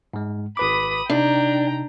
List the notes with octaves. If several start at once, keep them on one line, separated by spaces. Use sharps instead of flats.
G#2 G#3
G#1 B4 B5 D6 D#6
C3 D4 D#4 G5 A#5